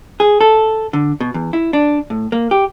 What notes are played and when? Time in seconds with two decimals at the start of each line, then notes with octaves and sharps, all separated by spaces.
0.20 G#4
0.41 A4
0.93 D3
1.20 B2
1.34 E2
1.53 E4
1.73 D4
2.10 A2
2.32 A#3
2.51 G4